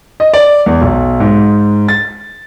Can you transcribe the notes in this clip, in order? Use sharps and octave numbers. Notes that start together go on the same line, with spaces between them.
D#5
D5
E2
B1
G#2
A6